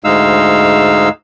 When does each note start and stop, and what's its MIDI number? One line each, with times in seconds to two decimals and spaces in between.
0.04 1.09 38
0.04 1.09 44
0.04 1.09 56
0.04 1.09 63
0.04 1.09 77
0.04 1.09 88